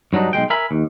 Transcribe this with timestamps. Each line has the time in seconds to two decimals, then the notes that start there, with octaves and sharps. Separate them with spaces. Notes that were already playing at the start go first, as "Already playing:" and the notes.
0.13 G2 F#3 D4 D#4
0.33 B1 A#2 G#3 G5
0.50 A#4 E5 G#5 B5
0.71 D#2